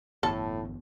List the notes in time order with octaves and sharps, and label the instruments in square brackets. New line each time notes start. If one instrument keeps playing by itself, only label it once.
[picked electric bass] G1 E2 [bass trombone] A2 [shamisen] A4